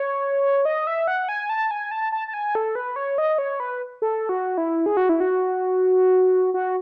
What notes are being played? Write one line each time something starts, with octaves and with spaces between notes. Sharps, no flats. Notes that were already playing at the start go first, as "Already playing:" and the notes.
Already playing: C#5
D#5
E5
F#5
G#5
A5
G#5
A5
A5
A5
G#5
A4
B4
C#5
D#5
C#5
B4
A4
F#4
E4
G#4
F#4
E4
F#4
F#4